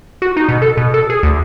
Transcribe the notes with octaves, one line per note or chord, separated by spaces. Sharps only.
F#4
D#4
B2
A4
B2
A4
G#4
D2